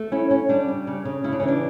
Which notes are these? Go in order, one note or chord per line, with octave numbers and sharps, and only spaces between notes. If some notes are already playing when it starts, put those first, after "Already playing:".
Already playing: A3
C#4 E4
C#4
G3 D4
C#3
C#3
C#3
C#3 E4
D4
E3 C#4
D4